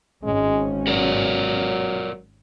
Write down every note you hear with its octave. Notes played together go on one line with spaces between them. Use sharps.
G#1 G#2 G#3 C#4
F#3 F#4 A#4 D5